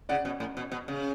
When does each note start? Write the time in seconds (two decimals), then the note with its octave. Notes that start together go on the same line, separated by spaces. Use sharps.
0.09 C#3 D5 F#5
0.25 B2
0.40 A2
0.57 B2
0.71 B2
0.88 C#3